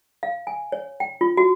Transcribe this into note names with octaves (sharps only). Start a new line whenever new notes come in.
F5
G#5
C#5
G5
F4
F#4